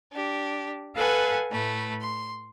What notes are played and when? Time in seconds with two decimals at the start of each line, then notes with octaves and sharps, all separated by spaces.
0.12 D4 G4
0.94 A4 B4 F5 F#5 G#5 A5
1.50 A2 A3 B4
2.01 C6